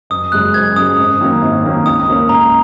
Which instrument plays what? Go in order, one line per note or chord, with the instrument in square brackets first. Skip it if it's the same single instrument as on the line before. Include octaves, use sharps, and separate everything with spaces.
[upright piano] F#1 [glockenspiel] D#6
[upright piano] F#2 C#3 G#3 [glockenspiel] F#6
[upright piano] F#1 [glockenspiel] G#6
[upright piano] F#2 C#3 G#3 [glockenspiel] D#6
[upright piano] G#1
F#2 D#3 A#3 C#4
G#1
F#2 D#3 A#3 C#4
[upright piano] C#2 [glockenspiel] D#6
[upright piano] C#3 A#3 C#4 A#4
[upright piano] C#2 [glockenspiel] A#5